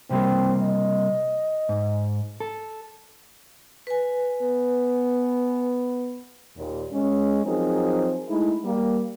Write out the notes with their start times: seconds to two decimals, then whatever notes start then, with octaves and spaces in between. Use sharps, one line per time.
0.10 C3 G3 A#3 C4
0.62 D#5
1.69 G#2
2.40 A4
3.87 B4 G#5
4.42 B3
6.57 D#2 A#2
6.92 G#3 C#4
7.46 F3 F#3 C4 D#4 G#4 A#4
8.29 G#3 A3 D#4 E4
8.65 G3 A#3